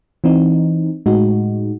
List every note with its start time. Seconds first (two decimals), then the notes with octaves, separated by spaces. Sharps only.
0.24 E3 C4 D#4
1.06 A2 G#3 D#4 F#4